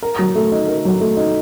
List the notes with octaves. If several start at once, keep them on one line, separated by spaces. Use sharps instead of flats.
A#4
F#3
A3
D#4
A#4
F#3
A3
D#4